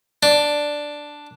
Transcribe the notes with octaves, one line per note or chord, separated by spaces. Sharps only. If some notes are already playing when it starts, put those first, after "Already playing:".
D4